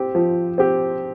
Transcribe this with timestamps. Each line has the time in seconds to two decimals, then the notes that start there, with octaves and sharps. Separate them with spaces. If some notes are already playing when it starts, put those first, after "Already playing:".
Already playing: C4 G4
0.15 F3
0.58 C4 G4